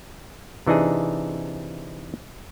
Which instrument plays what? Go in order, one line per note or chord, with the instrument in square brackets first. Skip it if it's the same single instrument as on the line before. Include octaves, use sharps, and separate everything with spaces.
[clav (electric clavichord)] C3 E3 D4 D#4 G#4